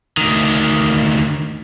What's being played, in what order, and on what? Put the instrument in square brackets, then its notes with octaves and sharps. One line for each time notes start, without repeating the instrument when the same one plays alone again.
[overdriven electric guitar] D2 D#3